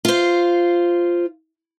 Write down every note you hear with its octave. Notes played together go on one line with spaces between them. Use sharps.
F4 C5